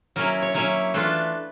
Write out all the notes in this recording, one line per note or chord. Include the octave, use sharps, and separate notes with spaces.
F#3 A#3 C#4 E4 A#4
C#5
F#3 A#3 C#4 E4 C#5
E3 A3 D4 F4 B4